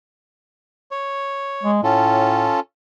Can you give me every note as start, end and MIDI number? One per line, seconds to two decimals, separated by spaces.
0.91 1.71 73
1.63 1.82 56
1.84 2.50 45
1.84 2.60 61
1.84 2.60 65
1.84 2.60 69